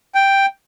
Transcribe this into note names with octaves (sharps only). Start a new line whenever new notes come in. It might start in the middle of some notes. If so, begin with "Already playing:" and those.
G5